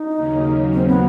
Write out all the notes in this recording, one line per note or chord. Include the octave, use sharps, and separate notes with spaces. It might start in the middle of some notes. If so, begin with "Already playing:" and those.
Already playing: D#4
D#2 C#3 F#3 A#3 C#4
C4
B3